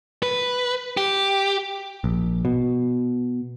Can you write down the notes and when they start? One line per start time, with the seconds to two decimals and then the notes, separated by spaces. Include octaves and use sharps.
0.23 B4
0.97 G4
2.04 A#1
2.45 B2